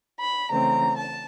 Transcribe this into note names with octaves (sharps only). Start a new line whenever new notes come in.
B5
C#3 E3 A3 C4 A#5
A5